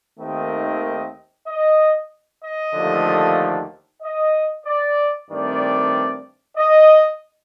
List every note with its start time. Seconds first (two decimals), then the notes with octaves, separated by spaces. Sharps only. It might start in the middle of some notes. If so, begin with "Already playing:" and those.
0.19 D#2 D#3 A3 C4 D#5
1.47 D#5
2.42 D#5
2.74 D#2 D3 F3 A3
4.02 D#5
4.66 D5
5.30 G2 D#3 A3 C4 D5
6.57 D#5